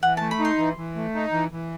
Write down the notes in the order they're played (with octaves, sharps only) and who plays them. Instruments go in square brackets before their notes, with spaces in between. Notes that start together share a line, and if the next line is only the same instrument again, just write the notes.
[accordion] E3 [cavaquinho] F#5
[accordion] A3 [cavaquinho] A5
[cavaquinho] B5
[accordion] D#4
[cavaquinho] C6
[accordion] E3
E3
A3
D#4
E3
E3